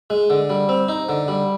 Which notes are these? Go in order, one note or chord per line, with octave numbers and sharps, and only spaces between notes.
G#3
D3
G3
C4
D#4
D3
G3